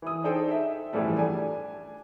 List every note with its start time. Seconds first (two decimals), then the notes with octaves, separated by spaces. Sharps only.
0.02 E3 D#6
0.24 D4 D#4 G#4 A4 C5 G5
0.51 E5
0.93 A2 C#3 E3 F3 G3 A3
1.18 D4 G#5